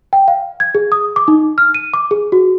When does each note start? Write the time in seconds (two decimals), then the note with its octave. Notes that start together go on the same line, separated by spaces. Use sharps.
0.13 G5
0.28 F5
0.60 G#6
0.75 G#4
0.92 D#6
1.16 D6
1.28 D#4
1.58 F6
1.75 D#7
1.94 D6
2.11 G#4
2.32 F#4